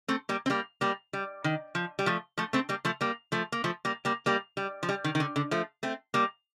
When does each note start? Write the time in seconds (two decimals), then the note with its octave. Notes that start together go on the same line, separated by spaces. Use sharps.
0.08 A3 C4
0.29 G3 A#3
0.46 C4
0.50 G3 A#3
0.81 G3 A#3
1.13 G3
1.44 D#3
1.75 F3
1.99 G3
2.06 F3 A3
2.38 F3 A3
2.53 A3 C4
2.69 G3 A#3
2.85 F3 A3
3.01 G3 A#3
3.32 F3 A3
3.52 A#3
3.64 F3 A3
3.85 G3 A#3
4.05 G3 A#3
4.26 G3 A#3
4.57 G3
4.83 F3
4.89 G3
5.04 D#3
5.15 D#3
5.20 D3
5.36 D3
5.51 F3 A3
5.83 A3 C4
6.14 G3 A#3